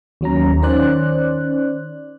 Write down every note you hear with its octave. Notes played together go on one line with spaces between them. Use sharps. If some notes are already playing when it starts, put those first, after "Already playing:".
D#2 F#3 C#4 A#5
D#3 C#4 C5 D5 F#6